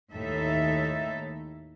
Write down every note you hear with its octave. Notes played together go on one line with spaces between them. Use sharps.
D#2 A2 D#4 A4 E5